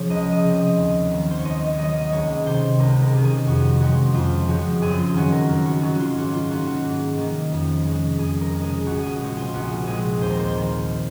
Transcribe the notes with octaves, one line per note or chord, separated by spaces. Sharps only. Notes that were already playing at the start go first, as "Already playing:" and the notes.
Already playing: C#3 F3 C#5
C#2 D#5
D#5
C#3 F3 C4
D#5
D#2
D#3 F#3 A#3
C5
C#5
D#2 D#5
D#5
D#3 F#3 A#3 D#5
D#5
C#2 C#5
C3 D#3 C5
C#2 A#4
A#4
C3 D#3
G#4
F2 F#4
C#3 F3 G#3 C4 F#4
F2 F4
C#3 F3 G#3 C4 F#4
F#2 G#4
F4
D#3 F#3 C#4 F#4
A#4
F#2 A#4
F#4
D#3 F#3 C#4 F#4
F4
G#2 F#4
F4
D#3 A#3 C#4 F#4
F#4
G#2
D#3 A#3 C#4
F2
C#3 G#3
F2 G#4
A#4
C#3 G#3
G#4
A#1 F#4
G#4
A#2 G#3 C4 F#4
F4
A#1 F#4
A#2 G#3 C4 G#4
D#2 C5
A#4
C5
D#3 A#3